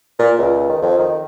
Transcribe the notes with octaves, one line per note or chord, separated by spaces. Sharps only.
A#2
C#2
D#3
F2
D#3